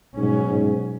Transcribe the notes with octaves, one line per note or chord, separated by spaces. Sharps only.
G#2 B2 F#3 C#4
G#2